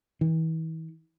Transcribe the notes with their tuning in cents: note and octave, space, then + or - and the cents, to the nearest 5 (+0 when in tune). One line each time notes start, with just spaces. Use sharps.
E3 -40